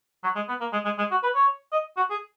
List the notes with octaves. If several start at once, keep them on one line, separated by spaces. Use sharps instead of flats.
F#3
G#3
B3
A#3
G#3
G#3
G#3
F#4
B4
C#5
D#5
F#4
G#4